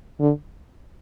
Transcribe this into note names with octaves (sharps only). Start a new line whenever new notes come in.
D3